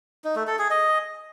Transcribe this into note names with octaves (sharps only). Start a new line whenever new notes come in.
D#4
A3
A4
G#4
D#5